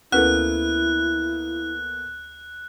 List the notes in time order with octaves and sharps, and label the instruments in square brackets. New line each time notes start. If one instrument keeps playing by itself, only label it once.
[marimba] D2 C#4 B4 [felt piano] A#3 B3 A4 [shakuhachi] E4 [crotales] F#6